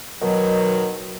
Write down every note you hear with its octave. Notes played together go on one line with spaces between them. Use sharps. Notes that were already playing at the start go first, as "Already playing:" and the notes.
B2 D#3 F#3